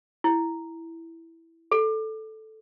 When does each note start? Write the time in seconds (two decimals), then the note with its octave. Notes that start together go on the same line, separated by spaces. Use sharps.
0.24 E4
1.72 A4